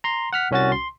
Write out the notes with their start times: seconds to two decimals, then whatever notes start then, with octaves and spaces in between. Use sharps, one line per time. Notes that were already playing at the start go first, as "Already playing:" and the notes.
0.04 A#5 C6
0.33 F#5 F6 B6
0.51 C2 C#4 F#4 A6
0.72 C6